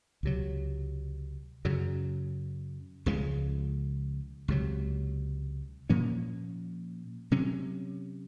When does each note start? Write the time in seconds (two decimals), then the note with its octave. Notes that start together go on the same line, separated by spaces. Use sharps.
0.23 C#2 C3 F#3
1.65 F#2 C#3 F#3
3.06 C#2 C#3 F3 G#3
4.48 C#2 C3 F#3
5.90 A#2 F3 A#3 C#4
7.31 C3 F#3 C#4